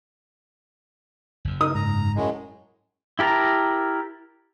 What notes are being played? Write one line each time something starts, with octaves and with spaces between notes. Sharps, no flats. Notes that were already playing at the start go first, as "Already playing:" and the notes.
F#1 F#2
D#4 A#4 D#6
G#2 A#5
F#2 A2 G#3
E4 G4 A#4 A5 A#5